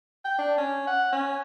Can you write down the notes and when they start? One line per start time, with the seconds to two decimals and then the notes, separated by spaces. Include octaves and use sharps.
0.25 G5
0.39 D4
0.58 C#4
0.87 F#5
1.13 C#4